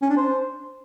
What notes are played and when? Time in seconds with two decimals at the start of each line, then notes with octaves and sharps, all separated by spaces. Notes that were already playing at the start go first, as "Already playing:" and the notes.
0.02 C#4
0.10 D4
0.17 C5